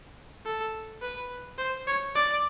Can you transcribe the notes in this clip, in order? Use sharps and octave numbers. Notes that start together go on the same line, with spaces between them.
A4
B4
C5
C#5
D5